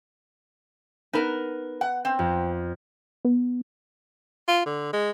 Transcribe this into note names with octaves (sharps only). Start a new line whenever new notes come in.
B3 D#4 A#4 B4 E7
F#5
C4
F2
B3
F4
D3
G#3